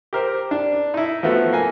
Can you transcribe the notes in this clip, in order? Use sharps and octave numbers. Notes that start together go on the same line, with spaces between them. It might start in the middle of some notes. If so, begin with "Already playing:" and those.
G4 A#4 C5
D4
D#4 E4
F3 A3 B3 F#4 A4
A#3 G#5